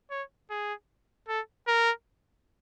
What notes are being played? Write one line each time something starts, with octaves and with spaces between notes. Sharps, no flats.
C#5
G#4
A4
A#4